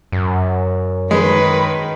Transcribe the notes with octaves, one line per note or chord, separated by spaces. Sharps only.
F#2
D#3 G#3 B4